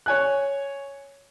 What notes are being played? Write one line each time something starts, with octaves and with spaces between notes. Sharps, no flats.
C#5 G#5 F#6